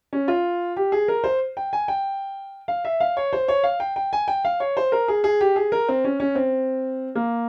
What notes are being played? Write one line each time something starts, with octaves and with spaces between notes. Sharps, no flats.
C#4
F4
G4
G#4
A#4
C5
G5
G#5
G5
F5
E5
F5
C#5
C5
C#5
F5
G5
G5
G#5
G5
F5
C#5
C5
A#4
G#4
G#4
G4
G#4
A#4
C4
C#4
C#4
C4
A#3